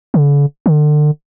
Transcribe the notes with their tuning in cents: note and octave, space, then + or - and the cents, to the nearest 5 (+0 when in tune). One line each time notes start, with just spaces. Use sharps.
D3 -45
D3 +35